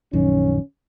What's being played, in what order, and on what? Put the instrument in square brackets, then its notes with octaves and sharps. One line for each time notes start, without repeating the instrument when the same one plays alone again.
[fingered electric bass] A#1 F#2 D#3 [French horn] C#4